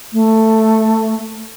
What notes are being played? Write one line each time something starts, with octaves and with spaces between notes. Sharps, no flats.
A3